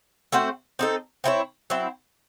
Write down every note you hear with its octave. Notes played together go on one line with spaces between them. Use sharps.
A3 C4 F#4 C5
C4 D#4 A4
C4 E4 G#4 C#5
F#3 C4 E4